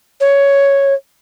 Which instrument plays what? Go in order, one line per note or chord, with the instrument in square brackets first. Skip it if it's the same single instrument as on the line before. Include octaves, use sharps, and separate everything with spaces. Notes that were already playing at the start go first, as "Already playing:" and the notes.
[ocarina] C#5